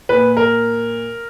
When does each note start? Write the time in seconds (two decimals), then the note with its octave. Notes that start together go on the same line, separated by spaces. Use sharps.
0.09 A#2 B4
0.37 A#4